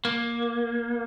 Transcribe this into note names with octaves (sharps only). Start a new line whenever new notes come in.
A#3